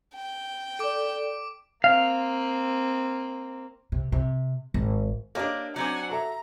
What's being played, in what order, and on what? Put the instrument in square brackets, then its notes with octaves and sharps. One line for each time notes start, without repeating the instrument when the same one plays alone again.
[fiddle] G5
[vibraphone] A4 D5 [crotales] D6 D7
[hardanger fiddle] A#3 C4 [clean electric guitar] F5
[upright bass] C3
C3
G#1
[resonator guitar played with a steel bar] A#3 D4 [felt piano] G4 C#5 D#5
[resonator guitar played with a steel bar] F#3 C4 D4 [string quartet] F#5 G#5
[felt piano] F#4 A4 E5 [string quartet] A#5